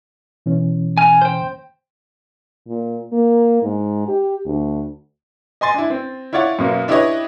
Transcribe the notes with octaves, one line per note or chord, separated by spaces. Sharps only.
B2 E3 C#4
G#5 F6
C5 G5
A#2
A#3
G#2
G4
D2
D#5 G#5 C6 A6
D4 E4
C4
E4 F4 C#5 D5 F#5
F#2 B2 A#3
D4 E4 G4 B4 C#5 D#5